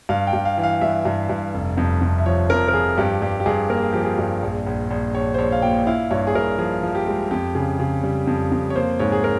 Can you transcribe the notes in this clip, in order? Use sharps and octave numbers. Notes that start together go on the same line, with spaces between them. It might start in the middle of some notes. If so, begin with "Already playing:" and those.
G2 F5
G5
G2
F5
E3
F5
G2 E5
G2
G2
F1
F2
F2
E5
F3 C#5
F2 A#4
A#4
F3 G#4
G2 G4
G2 G4
G4
G2 G#4
A#3 A#4
G#4
F3 G4
G#4
G2
A#1
A#1
A#1
A#1 C#5
C5
A#1 C#5
F5
A#2 G5
E4 F5
G2 C#5
G#4
G2 A#4
F3 G#4
F3
G4
G#3
F2 G4
C#3
C#3
G3
F2
F2
C#5
A#3 C5
G#2 C#5
G#4
A#4